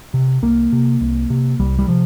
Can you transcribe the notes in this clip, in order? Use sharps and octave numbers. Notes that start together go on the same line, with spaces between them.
C3
C2 A#3
C3
C2
C3
C2 G3
G3
C3 F3